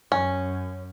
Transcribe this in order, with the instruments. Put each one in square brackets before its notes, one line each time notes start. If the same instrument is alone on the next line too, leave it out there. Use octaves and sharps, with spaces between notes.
[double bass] F#2 [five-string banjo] C#4